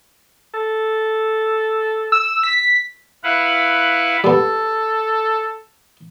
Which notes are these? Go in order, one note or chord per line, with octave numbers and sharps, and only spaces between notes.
A4
E6
B6
E4 B4 F5 F#5
G3 B3 A4